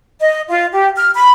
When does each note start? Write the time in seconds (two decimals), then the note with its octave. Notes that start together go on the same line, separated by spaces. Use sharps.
0.20 D#5
0.48 F4
0.71 G4
0.97 F6
1.14 B5